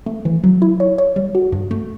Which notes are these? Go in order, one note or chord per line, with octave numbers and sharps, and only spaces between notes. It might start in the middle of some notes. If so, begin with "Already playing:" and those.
A3
E3
F#3
E4
C#5
C#5
G3
F#4
G2
A3